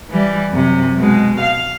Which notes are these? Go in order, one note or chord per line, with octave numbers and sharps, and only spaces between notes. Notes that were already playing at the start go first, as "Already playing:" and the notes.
E3 G3
F#2 C3
B2 G#3
F5